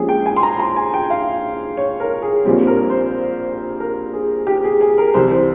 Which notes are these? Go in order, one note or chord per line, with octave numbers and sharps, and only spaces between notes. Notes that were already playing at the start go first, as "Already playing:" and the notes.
Already playing: A#1 A#2 G#3 C#4 G4 G#4
G5
G#5
C6
A#5
A#5
G#5
G5
F5
C#5
A#4
G#4
A#1 A#2 G3 C4
A#4
C5
A#4
G#4
G4
G#4
G#4
A#4
C2 C3 E3 G3 C5
C5